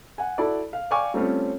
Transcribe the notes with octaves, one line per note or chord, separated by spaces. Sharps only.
F#5 G#5
E4 F#4 A4 D5
F5
D5 F5 G5 G#5 C#6 D6
G3 A3 C4 C#4 F4 C#5